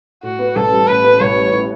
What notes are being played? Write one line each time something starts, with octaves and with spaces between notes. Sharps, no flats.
A2 F#4
B3
A1 A4
G3
A2 B4
B3
A1 C#5
G3
A2